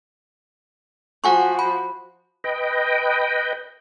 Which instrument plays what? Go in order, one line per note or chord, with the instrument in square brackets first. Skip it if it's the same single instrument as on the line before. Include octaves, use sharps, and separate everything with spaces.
[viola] F3 F#4 [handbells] F#5 G#5 C#6
[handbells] B5
[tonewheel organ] B4 D#5 G5